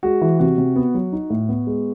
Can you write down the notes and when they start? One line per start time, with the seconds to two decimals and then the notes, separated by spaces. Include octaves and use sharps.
0.03 G#3 F#4
0.21 E3
0.39 C3 F#4
0.58 C3
0.76 B3
0.94 F#3
1.12 D#4
1.30 A2
1.49 B3
1.67 G#3